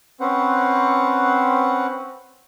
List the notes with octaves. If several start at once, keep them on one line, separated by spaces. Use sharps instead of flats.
C4 C#4 B4 C5 F#5